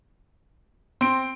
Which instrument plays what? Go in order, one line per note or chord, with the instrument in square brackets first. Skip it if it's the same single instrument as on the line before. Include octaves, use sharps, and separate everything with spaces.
[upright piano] C4 [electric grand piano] C6 D7